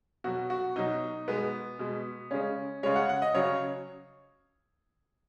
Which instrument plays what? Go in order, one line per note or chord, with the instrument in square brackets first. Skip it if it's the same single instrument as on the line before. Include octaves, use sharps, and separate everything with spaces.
[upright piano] B2 F#3 F#4
F#4
B2 F#3 D#4
B2 G#3 B3
B2 G#3
C#3 G#3 C#4
C#3 G#3 C#5
F#5
F#5
D#5
C#3 F#3 C#5